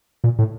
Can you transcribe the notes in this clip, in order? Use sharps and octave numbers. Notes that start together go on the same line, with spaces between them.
A#2
A2